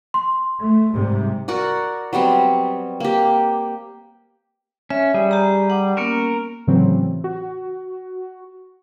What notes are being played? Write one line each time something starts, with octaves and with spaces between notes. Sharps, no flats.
C6
A3
G#2 C3 G3
F#4 A#4 D5 F#5
F#3 G3 B3 C4
A#3 G4
C#4 E5
G3 G#4
G4 A#5
F#5 D6
A#3 B3 C#4 A#4
A2 C#3 E3 F#3 C4
F#4